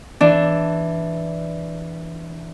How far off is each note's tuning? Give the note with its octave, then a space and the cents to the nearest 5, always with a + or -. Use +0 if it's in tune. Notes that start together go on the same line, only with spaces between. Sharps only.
E3 +0 D4 +0